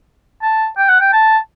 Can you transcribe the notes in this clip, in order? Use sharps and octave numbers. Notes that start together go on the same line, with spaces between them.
A5
G5
F#5
G5
A5